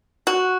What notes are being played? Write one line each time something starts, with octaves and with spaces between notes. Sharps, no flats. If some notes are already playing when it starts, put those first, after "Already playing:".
F#4